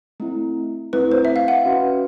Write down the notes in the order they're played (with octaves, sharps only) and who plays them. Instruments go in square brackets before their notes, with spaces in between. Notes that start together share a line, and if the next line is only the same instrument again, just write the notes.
[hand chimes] A3 C4 E4
[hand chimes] A3 C4 E4 [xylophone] B4
[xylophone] C5
E5
F5
F#5
[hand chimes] C#4 F#4 B4